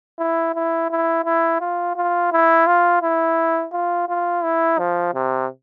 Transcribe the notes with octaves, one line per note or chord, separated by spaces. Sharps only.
E4
E4
E4
E4
F4
F4
E4
F4
E4
F4
F4
E4
F3
C3